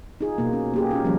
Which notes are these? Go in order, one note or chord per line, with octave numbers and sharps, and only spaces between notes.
D#4 F4 G#4
B2 A#3
C#4
A#3 G4 G#4
C#4 F4 A#4
D#3 F3 G3 A#3 C#4